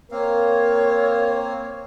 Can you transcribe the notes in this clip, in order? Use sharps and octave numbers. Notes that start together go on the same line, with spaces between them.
A#3 C4 A#4 C#5 F5